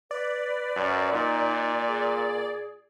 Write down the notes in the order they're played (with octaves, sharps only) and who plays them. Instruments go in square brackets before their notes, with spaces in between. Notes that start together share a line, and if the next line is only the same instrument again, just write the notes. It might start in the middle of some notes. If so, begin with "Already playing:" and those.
[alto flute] B4 [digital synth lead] D5
[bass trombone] F#2
[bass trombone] A#2 [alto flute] D#4
[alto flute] G#4